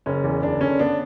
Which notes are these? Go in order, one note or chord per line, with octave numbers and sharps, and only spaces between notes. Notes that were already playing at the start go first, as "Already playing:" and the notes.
F#1 C#4
E2
F#1 D4
D3 C#4
B3 D4